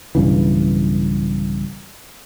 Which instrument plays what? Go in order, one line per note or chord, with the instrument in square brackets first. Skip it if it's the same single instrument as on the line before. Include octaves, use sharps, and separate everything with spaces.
[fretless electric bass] B1 G2 C#3 E3